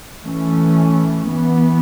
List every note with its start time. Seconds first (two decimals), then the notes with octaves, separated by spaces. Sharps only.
0.23 E3 A3 C#4
1.29 E3 B3